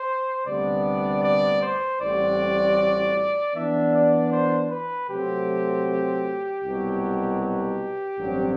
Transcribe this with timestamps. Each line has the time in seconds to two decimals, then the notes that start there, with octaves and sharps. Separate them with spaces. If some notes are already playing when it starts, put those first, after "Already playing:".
Already playing: C5
0.46 D2 C3 G3 B3 D4 D5
1.24 D5
1.62 C5
2.01 A1 A2 G3 C4 F#4 D5
3.55 E3 B3 D4 E5
3.94 D5
4.32 C5
4.70 B4
5.09 C3 F#3 A3 C4 G4
6.63 C2 B2 F#3
7.41 G4
8.18 A1 G2 F#3 C4